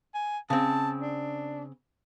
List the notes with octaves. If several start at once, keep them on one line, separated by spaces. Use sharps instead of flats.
G#5
C#3 C4 A5
D4